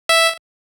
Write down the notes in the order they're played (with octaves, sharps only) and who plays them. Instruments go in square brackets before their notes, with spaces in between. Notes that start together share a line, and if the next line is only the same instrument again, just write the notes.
[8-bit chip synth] E5